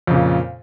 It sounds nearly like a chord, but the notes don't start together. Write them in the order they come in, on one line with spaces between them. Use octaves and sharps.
F2 C#3 A#2